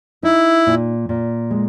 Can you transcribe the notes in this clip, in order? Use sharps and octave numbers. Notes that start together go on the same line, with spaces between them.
D#4 E4
A#2
A#2
G#3